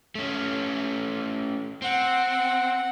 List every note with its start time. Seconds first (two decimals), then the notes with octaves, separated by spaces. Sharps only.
0.15 A3 C#4
1.82 C4 F#5